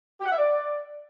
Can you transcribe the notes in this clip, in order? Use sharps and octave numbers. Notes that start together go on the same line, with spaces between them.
G4
F#5
E5
D5